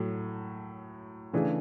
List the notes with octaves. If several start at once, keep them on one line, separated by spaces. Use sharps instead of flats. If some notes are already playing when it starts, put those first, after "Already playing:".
Already playing: A2 F#3 A3
C#3 E3 A3 D4 G#4